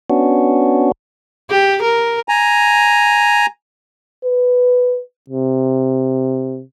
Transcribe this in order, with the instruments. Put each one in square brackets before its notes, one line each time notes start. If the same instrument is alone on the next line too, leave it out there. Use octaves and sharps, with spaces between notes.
[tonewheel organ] B3 C#4 D4 F#4
[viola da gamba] G4
A#4
[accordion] G#5 A#5
[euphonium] B4
C3